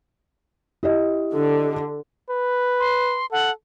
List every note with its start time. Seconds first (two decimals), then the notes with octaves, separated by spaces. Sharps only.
0.83 E4 G4 D#5
1.34 D3
2.30 B4
2.80 C6
3.32 A4 F#5